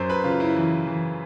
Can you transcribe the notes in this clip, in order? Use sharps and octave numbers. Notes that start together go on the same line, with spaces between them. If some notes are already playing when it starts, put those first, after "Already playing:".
Already playing: F#2 C5
B4
C#3 F4
E4
E3
E3